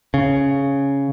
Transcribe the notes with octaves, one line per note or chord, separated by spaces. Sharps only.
C#3